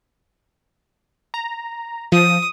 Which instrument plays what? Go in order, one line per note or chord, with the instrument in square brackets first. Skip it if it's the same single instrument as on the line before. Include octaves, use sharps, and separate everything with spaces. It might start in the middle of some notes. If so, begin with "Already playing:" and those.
[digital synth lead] A#5
[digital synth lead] F3 [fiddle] D#6